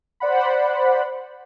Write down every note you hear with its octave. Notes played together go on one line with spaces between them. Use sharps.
C5 D5 F#5 B5